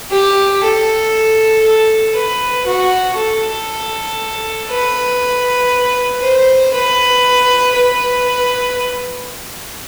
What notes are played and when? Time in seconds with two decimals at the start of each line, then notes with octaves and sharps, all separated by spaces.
0.11 G4
0.63 A4
1.64 A4
2.15 B4
2.66 F#4
3.17 A4
4.70 B4
6.22 C5
6.74 B4
7.75 B4